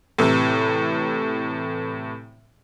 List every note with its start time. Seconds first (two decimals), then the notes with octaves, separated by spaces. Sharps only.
0.18 A2 C3 E3